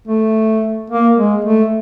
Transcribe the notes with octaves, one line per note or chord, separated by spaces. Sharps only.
A3
A#3
G#3
A3